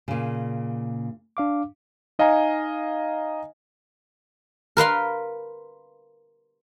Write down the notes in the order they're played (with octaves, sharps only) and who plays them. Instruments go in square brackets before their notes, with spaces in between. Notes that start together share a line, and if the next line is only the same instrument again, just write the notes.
[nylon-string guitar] A#2 C#3
[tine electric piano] D4 F5 D6
[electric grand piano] D#4 D#5 F5 G#5 A#5
[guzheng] A#4 B4 F5 C6